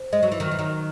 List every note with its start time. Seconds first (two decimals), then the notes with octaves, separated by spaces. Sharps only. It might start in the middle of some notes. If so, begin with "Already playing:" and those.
Already playing: C5
0.13 G#3 D#5
0.23 F#3
0.32 E3
0.40 D#3 F#3
0.51 E3
0.59 D#3 F#3